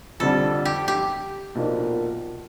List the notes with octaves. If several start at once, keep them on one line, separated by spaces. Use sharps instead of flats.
F2 D3 G3 A4
G4
G4
B1 A#2 F3 A#3 D4